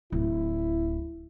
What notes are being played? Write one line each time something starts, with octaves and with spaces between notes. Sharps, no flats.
D1 E4